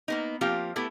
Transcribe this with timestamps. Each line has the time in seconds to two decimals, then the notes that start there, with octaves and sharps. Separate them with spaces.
0.08 A#3 B3 D#4
0.41 F3 A#3 C4 F4 G4
0.76 A3 B3 E4 G4 A4